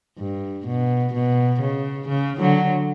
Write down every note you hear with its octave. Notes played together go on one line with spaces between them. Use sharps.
G2
B2
B2
C#3
C#3
D3 F#3